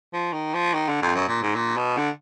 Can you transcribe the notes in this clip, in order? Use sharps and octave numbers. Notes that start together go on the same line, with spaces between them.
F3
D#3
F3
D#3
D3
F2
F#2
A#2
G#2
A#2
B2
D3